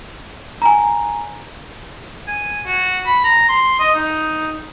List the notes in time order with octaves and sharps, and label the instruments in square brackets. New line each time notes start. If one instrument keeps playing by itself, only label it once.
[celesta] G#5 A#5
[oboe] G#5
F#4
B5
A#5
C6
D#5
D#4